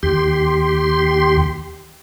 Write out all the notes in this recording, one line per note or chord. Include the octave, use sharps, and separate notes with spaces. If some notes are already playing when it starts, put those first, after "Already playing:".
D#2 G4 C6